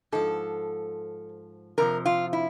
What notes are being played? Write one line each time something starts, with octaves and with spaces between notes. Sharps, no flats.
G#2 F3 A4
F2 C3 F3 A#4
F4
E4